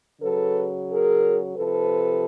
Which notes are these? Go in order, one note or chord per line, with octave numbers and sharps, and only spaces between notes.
C#3 F#3 A4 B4
G#4 A#4
C3 F3 A4 B4